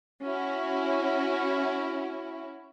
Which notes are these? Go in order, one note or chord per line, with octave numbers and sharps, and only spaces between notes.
C#4 E4 F#4